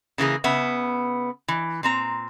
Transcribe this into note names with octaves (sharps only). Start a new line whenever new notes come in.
C#3 E3 A#3 G#4
C#3 B3 E5
E3
A#2 C4 A#5